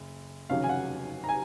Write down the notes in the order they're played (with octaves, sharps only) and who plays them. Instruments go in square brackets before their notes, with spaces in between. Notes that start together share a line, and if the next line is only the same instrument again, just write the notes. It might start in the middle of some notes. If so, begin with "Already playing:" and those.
Already playing: [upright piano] F#1
F1 D#2 C#3 F#3 F5
G#5
F#5
A#5
G#5